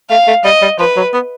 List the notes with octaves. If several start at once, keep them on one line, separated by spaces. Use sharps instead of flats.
A3 F5
A3
G3 D#5
G3
F3 B4
F#3
B3